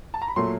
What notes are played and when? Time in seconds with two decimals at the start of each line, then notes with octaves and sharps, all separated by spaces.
0.14 A5
0.22 A#5
0.28 B5
0.36 A#2 F#3 A3 C6